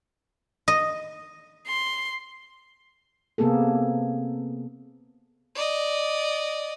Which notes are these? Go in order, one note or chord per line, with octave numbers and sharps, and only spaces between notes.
D#5
C6
C3 A#3 B3 G#4 A4
D5 D#5